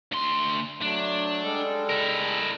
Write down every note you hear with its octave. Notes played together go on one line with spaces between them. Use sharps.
D2 C6
F#3 A3 D4
G3 G#3 A4
E4 A#4